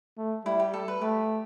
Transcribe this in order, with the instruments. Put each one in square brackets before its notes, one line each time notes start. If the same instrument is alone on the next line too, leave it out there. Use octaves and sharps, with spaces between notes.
[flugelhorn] A3
[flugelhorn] G3 [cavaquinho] E4
[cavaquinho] G4
A4
B4
[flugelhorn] A3 [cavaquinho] G4